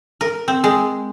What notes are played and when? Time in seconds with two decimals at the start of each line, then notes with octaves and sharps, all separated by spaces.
0.21 A#4
0.48 C4
0.64 G#3